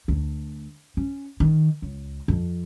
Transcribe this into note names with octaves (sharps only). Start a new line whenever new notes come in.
D2
C#4
D#3
C#2
F2